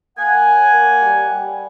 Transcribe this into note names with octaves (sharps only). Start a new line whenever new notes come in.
A#3 F#5 G#5
F#3
A#3
G3
G3